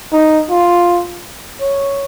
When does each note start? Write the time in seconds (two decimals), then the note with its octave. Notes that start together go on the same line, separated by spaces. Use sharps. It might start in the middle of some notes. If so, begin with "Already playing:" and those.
0.13 D#4
0.50 F4
1.61 C#5